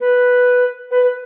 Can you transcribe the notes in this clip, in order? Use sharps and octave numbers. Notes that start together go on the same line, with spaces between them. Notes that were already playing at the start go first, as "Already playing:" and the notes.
B4
B4